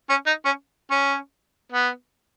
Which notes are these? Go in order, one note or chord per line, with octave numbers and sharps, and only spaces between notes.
C#4
D#4
C#4
C#4
B3